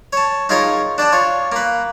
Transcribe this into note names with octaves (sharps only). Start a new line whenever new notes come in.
C#5 A5
D#4 F4 G#4 A#4 C#5 D#5
D4 D5 G5 A5
F4 C#5
A#3 B4